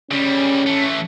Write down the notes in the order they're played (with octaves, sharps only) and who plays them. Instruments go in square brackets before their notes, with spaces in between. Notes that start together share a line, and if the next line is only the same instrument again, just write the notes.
[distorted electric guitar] C#3 G3 [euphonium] C#4
[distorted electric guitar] E3 A3